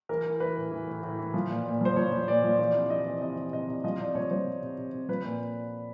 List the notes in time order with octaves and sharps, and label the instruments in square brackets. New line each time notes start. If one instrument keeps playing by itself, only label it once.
[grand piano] E3 A#4
E3
E3 B4
A2
E3
A2
A2
E3
F3
A#2
A#2
F3 C5
F3 C#5
F3
A#2 D5
F3
E3 D5
C3
E3 D#5
E3
C3 D#5
C3
C3 D#5
C3
F3 D#5
C3 D5
F3 C#5
F3 C5
C3
C3
C3
C3
F3 B4
A#2